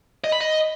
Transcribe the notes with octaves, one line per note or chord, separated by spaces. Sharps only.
D#5
B5
D#5